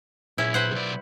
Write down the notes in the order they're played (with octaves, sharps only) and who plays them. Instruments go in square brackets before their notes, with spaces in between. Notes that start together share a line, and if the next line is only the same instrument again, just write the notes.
[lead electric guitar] A#2 G#4 [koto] C#4 E4
[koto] B4 C5 F#5
[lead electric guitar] B1 D5